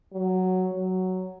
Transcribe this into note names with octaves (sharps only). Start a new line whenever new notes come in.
F#3
F#3